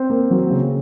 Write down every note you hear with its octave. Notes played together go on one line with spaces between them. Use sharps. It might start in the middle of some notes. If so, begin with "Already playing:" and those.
Already playing: C4 C5
A#3
F#3
C#3